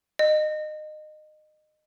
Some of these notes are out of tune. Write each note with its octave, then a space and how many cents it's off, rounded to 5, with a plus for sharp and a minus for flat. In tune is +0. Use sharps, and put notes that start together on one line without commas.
D#5 -25